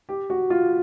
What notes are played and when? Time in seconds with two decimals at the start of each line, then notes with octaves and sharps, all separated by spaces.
0.09 G4
0.30 F#4
0.50 F4